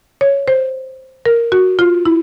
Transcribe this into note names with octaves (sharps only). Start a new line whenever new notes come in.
C#5
C5
A#4
F#4
F4
E4